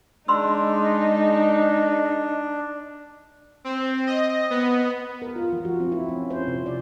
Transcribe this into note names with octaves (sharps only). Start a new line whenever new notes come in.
G#3 D4 D#4 B5 C6 E6
C4
D#5
B3
A#4
F4
F3
F#4
C4
E4
C#4
C5
C3
D5